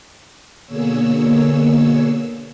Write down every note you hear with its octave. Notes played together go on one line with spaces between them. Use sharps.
B2 D3 A#3 G#4 C#5 E6